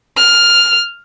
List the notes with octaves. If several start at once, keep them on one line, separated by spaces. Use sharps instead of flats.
F6